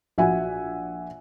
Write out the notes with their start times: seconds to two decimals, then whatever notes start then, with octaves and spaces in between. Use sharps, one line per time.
0.18 A#1 F#4 E5 F#5 G#5